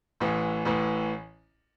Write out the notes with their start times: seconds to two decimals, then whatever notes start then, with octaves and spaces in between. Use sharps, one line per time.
0.20 A1 A2 E3
0.65 A1 A2 E3